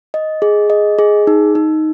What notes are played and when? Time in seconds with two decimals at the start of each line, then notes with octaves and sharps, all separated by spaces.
0.14 D#5
0.42 G#4
0.70 D#5
0.99 G#4
1.27 D#4
1.55 D#4